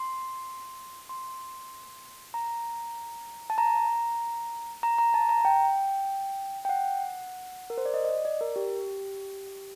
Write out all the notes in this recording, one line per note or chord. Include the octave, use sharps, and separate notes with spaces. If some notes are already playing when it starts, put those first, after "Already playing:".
Already playing: C6
C6
A#5
A5
A#5
A#5
A#5
A5
A#5
G5
G5
F#5
A#4
C5
D5
D#5
D#5
D5
D5
A#4
G4